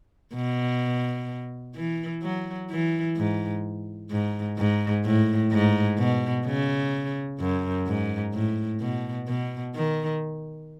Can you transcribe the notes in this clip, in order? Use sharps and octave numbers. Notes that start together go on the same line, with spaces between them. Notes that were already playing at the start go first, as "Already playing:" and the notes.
B2
E3
F#3
E3
G#2
G#2
G#2
A2
G#2
B2
C#3
F#2
G#2
A2
B2
B2
D#3